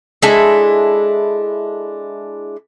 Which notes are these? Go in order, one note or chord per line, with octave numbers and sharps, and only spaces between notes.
G#3 D4 E4 A4